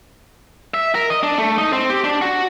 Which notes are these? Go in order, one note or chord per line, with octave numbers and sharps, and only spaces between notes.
E5
A#4
D#5
D4
A3
D#4
C4
G4
D4
F#4